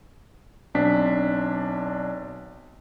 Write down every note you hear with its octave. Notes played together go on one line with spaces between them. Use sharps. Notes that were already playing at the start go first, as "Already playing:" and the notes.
B1 C4 D4 B6